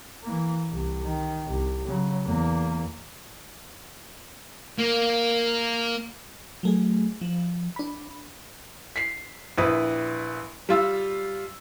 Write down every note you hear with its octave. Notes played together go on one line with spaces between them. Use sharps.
E3 A#3
C2
D#3
C2
C#3 F#3
E2 A#3
A#3
F#3 A3 G#4
F3
D4 B5
B6 C7
A#1 E4 B4 D#6
G3 F4 E6